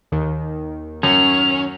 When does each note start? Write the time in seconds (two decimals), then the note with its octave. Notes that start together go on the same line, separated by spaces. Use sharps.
0.12 D#2 D#3
1.03 F#2 C#4 F7